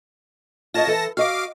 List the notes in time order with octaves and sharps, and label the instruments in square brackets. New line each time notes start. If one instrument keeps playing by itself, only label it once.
[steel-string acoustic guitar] F4 C#5 D#5 [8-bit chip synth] A5 A#6
[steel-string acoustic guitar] E3 A4
[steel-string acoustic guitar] F#4 D#5 [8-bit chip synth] F5 D6